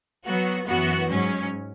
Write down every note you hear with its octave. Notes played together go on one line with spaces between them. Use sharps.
F#3 B3 F#4
F#2 E3 B3 F#4
G#2 F#3 C#4